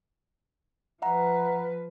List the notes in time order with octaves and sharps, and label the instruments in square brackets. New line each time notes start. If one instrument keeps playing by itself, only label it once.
[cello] F3 B4 [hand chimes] E5 F#5 A#5